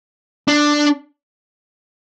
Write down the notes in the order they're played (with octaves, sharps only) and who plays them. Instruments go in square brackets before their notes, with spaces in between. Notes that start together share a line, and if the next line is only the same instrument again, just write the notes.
[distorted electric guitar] D4